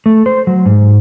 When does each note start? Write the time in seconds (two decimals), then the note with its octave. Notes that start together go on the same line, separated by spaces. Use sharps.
0.06 A3
0.26 C5
0.47 F#3
0.66 G#2